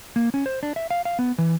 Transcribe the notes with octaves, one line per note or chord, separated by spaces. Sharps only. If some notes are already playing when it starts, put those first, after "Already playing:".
A#3
C#4
C5
D4
E5
F5
F5
B3
E3